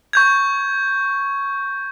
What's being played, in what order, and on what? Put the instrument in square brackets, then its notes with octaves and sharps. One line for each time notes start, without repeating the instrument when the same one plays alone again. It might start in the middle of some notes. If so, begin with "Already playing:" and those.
[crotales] C#6 G6 G#6